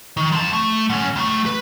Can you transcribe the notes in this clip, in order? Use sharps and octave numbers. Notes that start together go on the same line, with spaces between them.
D#3
C4 A5
A3
D3 C#4
C#2 A3
B4